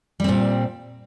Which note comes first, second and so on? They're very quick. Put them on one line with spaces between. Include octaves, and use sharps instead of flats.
G3 C4 A#2